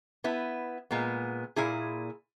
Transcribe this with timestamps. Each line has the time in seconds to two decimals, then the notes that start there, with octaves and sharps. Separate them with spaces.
0.24 B3 E4 B4
0.91 A#2 G#3 B3
1.56 A#2 A#3 E4 G#4